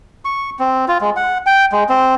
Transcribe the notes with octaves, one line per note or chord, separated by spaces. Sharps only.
C#6
C4
F4
G#3
F#5
G5
G#3
C4